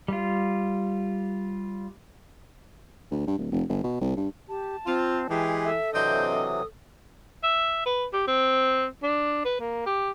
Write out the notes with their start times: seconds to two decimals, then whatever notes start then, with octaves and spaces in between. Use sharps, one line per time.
0.08 G3 F4
3.11 D2
3.27 G2
3.38 D1
3.51 F1
3.69 G1
3.84 B2
4.01 C2
4.17 G2
4.49 G4 A5
4.86 C4 F4
5.30 E3 G#3 G4 G#4 G5
5.65 A4 E5
5.94 C3 E3 F#3 C4 D4 D#5 G6
6.37 D#6
7.43 E5
7.85 B4
8.13 G4
8.27 C4
9.03 D4
9.45 B4
9.60 A#3
9.86 G4